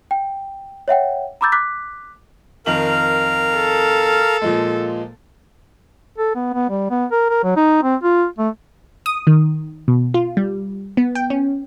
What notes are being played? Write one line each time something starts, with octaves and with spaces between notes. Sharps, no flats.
G5
C#5 E5 F#5 G5
A#5 B5 D6 E6 G6 A6
D6 F#6 B6
F2 D#3 A#4 F5 F#7
A4
A#2 F3 G#3
A4
B3
B3
G3
B3
A#4
A#4
F#3
D#4
C4
F4
A3
D#6
D#3
B2
F4
G3
B3
G5
C#4